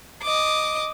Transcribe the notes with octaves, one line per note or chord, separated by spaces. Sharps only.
D#5 D6